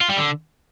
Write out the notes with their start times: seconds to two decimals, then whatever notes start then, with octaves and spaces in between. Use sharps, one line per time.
0.01 F4
0.09 G3
0.18 D3